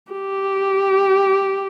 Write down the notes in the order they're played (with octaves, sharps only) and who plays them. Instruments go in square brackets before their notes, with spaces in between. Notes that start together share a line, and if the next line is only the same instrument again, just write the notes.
[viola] G4